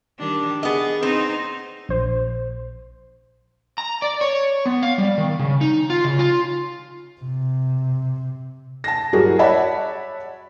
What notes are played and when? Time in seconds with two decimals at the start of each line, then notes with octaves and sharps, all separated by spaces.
0.19 D#3 G3 D4
0.63 B3 G#4 D#5
1.03 C4 D#4 C5
1.89 A#1 C5
3.78 A#5
4.02 D5
4.21 C#5
4.66 B3
4.83 F5
4.98 G3
5.18 D#3
5.39 C#3
5.61 D#4
5.90 F4
6.04 C#3
6.19 F4
7.21 C3
8.84 A5 A#6
9.13 F#3 G3 E4 F#4 G#4 A#4
9.39 C#5 D5 E5 F#5 A5 B5